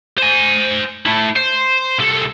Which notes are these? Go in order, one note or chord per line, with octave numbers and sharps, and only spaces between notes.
C5 G#5
A3 E4
C5
C2 A4